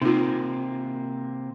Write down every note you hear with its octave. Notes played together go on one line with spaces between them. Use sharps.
C3 A#3 D#4 F4